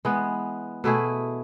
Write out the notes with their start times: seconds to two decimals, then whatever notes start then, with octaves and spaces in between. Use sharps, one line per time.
0.05 E3 G#3 B3
0.84 B2 A3 E4 G#4